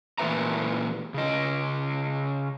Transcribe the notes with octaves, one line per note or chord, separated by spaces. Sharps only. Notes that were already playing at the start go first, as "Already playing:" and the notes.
A#2 E3 B3 B4 E5 A#5
C#3 D#5